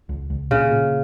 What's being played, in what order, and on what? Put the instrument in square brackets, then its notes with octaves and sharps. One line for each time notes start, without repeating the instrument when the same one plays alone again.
[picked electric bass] C#2
C#2
[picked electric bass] A#2 [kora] C#3
[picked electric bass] A#2